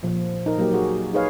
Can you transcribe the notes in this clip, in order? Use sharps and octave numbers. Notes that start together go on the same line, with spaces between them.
A#2 F3
D#4 A#4
F#3 A#3 G4
F#4 G#4
D#4 G#4 B4 C#5 F5